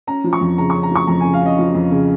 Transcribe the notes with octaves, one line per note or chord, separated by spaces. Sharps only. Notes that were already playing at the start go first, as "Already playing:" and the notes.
C#4 A#5
F3
C#6
F2
C#3 A#5
C#6
C#4
A#5
F3 C#6
F2 A#5
G#5
C#3
F5
C#4 D#5
F3
F2
C#3